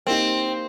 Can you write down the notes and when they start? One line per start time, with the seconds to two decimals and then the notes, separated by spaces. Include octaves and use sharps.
0.07 A#3 C4 D#4 G4